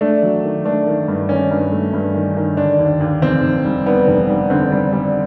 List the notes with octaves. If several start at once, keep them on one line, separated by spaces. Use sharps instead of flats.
A3 D4
F#3
D#3
A3 D4
D#3
G2
D#3 C#4
G2
A3
G2
D#3
D#3
D3 D4
D#2
D#2
F1 C4
F1
G3
G3 B3
F1
G3
D3 C4
G3
G3